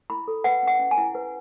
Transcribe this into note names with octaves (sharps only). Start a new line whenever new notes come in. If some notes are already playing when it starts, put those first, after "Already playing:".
E4 B5
A4
B4 F#5
C#4 F#5
C#4
G#5
E4
B4